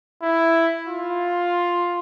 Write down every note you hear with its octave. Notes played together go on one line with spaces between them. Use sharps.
E4
F4